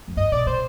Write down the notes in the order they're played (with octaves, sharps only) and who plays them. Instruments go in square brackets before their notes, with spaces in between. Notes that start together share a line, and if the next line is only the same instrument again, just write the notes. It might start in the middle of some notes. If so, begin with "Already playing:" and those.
[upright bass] F2
[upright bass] G2 [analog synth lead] D#5
[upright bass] B2 [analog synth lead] D5
[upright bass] C3 [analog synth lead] C5